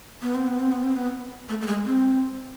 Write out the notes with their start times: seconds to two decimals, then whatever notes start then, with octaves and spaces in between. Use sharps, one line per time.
0.22 B3
0.35 C4
0.47 B3
0.59 C4
0.72 B3
0.84 C4
0.96 B3
1.49 A3
1.61 A3
1.67 G#3
1.86 C4